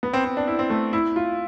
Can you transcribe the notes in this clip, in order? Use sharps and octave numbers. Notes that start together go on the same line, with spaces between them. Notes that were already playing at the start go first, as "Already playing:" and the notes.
B3
C4
C4
D4
E4
C4
A3
E4
F4